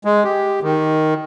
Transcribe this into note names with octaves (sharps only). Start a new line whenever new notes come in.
G#3
G4
D#3